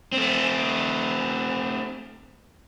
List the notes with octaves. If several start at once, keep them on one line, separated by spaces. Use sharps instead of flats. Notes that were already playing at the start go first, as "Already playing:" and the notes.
A3 C4